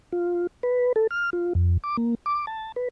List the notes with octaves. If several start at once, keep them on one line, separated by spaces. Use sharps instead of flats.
F4
B4
A4
F6
F4
F2
D6
A#3
D6
A5
B4